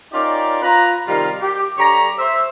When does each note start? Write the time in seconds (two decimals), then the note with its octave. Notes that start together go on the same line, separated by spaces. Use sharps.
0.13 C#4 D#4 F4 G4 A#4 D5
0.63 F4 B4 A#5
1.08 C3 D#3 G3 F4 F5 A#5
1.41 G4
1.78 G2 D3 G4 C#5 A#5
2.19 C5 E5